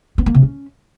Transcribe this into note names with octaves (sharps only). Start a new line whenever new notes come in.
B3
A#3
C3
C#4